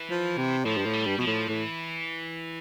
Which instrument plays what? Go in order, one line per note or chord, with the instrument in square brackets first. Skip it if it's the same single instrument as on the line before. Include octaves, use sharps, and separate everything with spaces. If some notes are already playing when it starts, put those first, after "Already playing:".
Already playing: [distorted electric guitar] E3
[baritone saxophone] F3
C3
[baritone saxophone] A2 [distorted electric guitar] F3
[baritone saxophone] G2
A2
[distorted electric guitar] G3
[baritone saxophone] G2
[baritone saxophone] B2 [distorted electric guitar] F3
[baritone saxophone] A2
[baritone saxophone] A2 [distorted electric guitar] E3